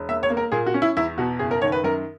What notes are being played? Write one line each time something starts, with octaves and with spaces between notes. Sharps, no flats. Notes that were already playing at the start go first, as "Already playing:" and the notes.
Already playing: E1
A#3 E5
C#5
A#3
A#4
A#2 G#4
F#4
C#4
E4
E2 E4
B2 F#4
F#1 G#4
A#4
D#3 C#5
B4
F#2 A#4